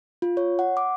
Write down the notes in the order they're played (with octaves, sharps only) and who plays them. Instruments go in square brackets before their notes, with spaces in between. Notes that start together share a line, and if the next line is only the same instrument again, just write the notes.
[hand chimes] F4
C#5
F#5
D6